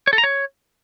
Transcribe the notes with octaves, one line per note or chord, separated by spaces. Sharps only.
C#5
A4
A#5
C#5